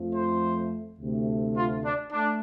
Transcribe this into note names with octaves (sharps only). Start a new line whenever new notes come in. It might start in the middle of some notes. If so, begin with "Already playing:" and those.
Already playing: F2 F3 A3
C5
D2 C3 A3
F4
D4
A3 D4